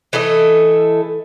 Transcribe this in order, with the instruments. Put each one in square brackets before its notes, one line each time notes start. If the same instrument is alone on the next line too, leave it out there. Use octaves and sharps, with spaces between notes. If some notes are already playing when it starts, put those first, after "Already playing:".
[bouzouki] E3 A3 A4 D#5